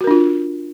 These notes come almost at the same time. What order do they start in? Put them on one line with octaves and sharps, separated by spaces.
F#4 A#4 D4 F4